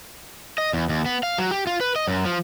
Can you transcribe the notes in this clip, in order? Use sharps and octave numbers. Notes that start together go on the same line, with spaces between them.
D#5
E2
D#2
B3
F5
F#3
G4
F4
B4
D#5
F#2
F3